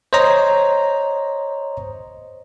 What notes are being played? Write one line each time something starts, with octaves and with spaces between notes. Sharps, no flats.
C5 C#5 D#5 A#5